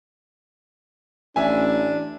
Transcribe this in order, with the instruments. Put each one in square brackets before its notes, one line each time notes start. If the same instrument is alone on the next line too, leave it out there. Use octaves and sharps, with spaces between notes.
[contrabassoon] A1 [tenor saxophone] D4 [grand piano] E5 G#5